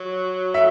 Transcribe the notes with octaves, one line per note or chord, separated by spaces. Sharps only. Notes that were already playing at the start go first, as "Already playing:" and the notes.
Already playing: F#3
E5